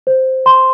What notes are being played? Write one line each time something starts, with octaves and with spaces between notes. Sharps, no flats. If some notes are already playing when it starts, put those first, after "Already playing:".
C5
C6